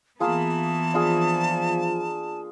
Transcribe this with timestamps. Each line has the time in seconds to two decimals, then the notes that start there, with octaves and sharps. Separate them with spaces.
0.20 E3 A#3 B3 F4 G#4 A5
0.94 F3 D4 F4 G#4